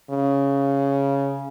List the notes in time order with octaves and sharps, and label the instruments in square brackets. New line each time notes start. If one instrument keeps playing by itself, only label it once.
[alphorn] C#3